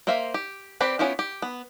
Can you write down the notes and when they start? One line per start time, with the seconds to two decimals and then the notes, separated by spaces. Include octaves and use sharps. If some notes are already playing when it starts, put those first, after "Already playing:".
0.07 A#3 C5 E5 F5
0.34 G4
0.80 C4 G4 B4 D5
0.99 B3 C#4 E4 F4 G4
1.19 G4
1.42 B3